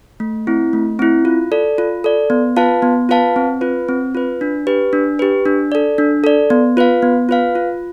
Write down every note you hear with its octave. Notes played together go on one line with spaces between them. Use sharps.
A3
C4 E4
A3
C4 E4
F4
A4 D5
F4
A4 D5
B3
F4 B4 F5 A5
B3
F4 B4 F5 A5
C4
F4 B4
C4
F4 B4
D4
G4 B4
D4
G4 B4
D4
A4 D5
D4
A4 D5
B3
F4 B4 F5
B3
F4 B4 F5
F4